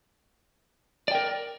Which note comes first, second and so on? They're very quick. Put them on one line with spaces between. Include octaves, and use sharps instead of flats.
D5 G5 A#4